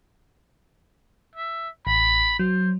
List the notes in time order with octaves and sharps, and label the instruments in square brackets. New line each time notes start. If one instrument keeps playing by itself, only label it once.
[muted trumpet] E5
[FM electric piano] A1 [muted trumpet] B5
[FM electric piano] F#3 [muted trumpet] C5